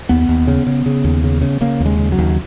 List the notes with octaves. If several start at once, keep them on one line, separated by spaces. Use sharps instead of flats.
D#2 B3
D#2
C#3
C#3
C#3
D#2
C#3
C#3
C#3 A#3
D#2
G#3
C#3
F#3
D#2